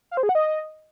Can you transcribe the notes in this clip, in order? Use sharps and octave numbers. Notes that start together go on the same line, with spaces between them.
F5
C5
G#4
F#5
D#5